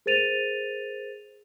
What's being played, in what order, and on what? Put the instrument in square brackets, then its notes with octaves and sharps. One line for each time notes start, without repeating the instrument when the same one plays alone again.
[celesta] G#4 A#4 C5 A6 D#7 F7